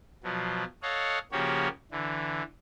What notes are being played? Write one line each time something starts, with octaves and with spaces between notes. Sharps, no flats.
B2 F3 F#3
A4 C#5 D#5 F5 F#5
C#3 F3 A#3 F#4 G4 C#5
D3 E3